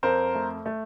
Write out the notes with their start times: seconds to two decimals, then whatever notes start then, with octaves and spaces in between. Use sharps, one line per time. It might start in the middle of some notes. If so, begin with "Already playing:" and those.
0.03 F2 A#4 C5
0.35 A3
0.66 A3